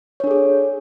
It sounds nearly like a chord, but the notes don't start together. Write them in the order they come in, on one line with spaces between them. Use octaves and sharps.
C#5 D4 A4 G#4